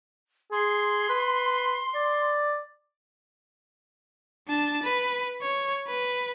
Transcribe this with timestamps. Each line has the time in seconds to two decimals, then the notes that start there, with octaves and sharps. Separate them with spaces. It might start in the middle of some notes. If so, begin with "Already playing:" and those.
0.52 G#4 C6
1.10 B4
1.95 D5
4.48 D4 A5
4.83 B4
5.41 C#5
5.88 B4